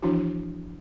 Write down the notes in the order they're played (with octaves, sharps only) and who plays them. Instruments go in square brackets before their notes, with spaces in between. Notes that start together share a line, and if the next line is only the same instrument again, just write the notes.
[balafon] E3 F3 D4 E4 F#4